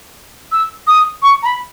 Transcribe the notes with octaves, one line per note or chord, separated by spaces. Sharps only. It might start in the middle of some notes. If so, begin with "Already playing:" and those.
E6
D#6
C#6
A#5
B5